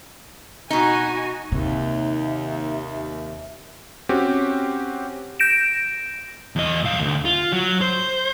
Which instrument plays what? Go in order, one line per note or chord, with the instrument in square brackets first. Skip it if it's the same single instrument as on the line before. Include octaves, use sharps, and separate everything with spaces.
[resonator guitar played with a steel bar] B2 D#4 [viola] F#4 G#5
[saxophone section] D#2 [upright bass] C3 [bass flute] E5
[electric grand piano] C4 C#4 F#4 G4
[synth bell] G6 A#6 D7 E7
[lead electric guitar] E2 D#5
C2 F5
D2
F4
F#3
C5